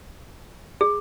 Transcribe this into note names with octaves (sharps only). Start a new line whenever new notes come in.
G#4